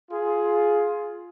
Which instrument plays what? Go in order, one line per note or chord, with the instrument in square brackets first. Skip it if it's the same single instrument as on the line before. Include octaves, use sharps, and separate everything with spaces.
[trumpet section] F4 G#4